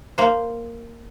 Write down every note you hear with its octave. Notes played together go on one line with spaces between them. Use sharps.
A#3 C5